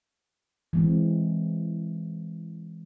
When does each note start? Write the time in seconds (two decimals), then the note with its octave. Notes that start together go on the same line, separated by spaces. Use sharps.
0.73 E3 G#3 C4